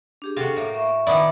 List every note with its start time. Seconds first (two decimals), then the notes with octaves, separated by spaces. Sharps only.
0.22 D4 G4 G#4
0.37 C3 F#4 A4 F5
0.56 A2 A#3
0.74 E5 C#6
1.07 A#2 D#3 B3 E4 D5